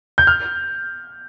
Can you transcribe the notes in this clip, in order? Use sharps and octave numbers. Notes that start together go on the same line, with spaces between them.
G6
F6